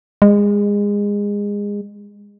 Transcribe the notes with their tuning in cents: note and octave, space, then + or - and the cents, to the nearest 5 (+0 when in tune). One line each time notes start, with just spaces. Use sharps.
G#3 -25